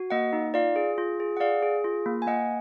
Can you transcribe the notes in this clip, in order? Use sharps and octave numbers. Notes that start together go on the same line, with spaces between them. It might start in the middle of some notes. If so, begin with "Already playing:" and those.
Already playing: F#4
A#3 D#5 F#5
D#4
F4 D5 F5
G#4
F4
G#4
F#5
G#4 D5 F5
G#4
F4
A#3
G#5
A#3 D#5 F#5